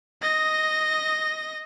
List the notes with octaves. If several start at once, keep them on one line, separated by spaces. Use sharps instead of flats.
D#5 A#6